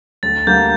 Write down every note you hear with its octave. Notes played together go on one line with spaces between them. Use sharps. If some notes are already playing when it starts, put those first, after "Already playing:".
D2 A6
D3 G3 A#3 G6